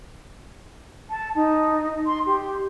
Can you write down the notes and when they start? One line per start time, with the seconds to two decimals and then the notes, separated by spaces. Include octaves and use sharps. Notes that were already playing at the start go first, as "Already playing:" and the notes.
1.10 A5
1.36 D#4
2.06 C6
2.27 G4